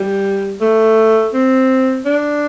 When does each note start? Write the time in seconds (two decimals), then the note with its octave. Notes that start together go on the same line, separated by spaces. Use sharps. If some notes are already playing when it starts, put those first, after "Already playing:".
Already playing: G3
0.61 A3
1.33 C4
2.05 D4